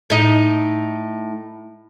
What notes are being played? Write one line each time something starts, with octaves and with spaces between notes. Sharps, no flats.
A2 D#4